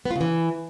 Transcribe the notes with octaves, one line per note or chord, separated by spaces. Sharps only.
B3
F4
C#3
E3